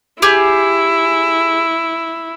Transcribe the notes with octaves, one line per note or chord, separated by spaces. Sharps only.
E4 G4 G#4